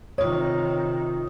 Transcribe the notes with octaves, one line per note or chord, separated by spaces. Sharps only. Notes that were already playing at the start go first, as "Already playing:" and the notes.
C3 D#3 F4 C#5 D#6